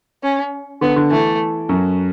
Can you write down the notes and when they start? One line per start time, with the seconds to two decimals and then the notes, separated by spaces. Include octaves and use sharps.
0.23 C#4
0.81 D3 B3
0.96 D3
1.11 E3 A3
1.69 F#2 F#3